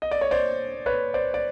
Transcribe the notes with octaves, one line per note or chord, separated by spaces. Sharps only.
D#5
D5
C#5
C5 D5
B4 C#5
C5 D5
D5